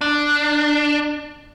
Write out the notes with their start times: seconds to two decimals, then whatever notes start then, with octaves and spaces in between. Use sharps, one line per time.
0.01 D4